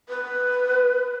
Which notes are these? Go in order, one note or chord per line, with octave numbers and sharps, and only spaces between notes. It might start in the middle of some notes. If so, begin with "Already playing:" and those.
B4